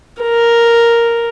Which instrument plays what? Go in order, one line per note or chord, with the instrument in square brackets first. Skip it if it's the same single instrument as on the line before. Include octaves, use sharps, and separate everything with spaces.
[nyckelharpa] A#4